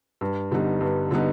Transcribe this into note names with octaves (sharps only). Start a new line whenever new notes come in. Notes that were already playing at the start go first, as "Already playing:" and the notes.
G2
D3 G3 B3 D#4
G2
D3 G3 B3 D#4